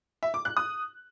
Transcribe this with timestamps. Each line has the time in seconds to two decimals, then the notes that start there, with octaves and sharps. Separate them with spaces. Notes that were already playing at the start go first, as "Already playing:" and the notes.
0.23 E5
0.34 D6
0.45 F#6
0.57 D#6